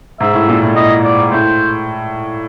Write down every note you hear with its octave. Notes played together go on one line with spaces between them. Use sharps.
G#2 E5
A2
A#2
A2
A2 D#5
D5
A2 C5